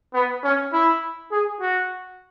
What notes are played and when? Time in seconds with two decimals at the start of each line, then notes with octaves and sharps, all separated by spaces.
0.14 B3
0.44 C#4
0.73 E4
1.32 G#4
1.61 F#4